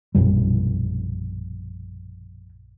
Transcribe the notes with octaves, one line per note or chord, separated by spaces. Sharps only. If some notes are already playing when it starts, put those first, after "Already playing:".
A#1 F#2 B2 G3